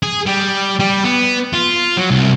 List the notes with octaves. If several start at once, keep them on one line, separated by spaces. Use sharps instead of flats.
G#4
G3
G3
B3
F4
F#3
C2